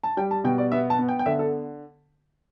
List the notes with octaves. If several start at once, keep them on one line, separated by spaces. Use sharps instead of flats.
A5
G3 G5
A5
B2 G5
D5
B3 E5
A5
B3
G5
G5
D3 E5
A4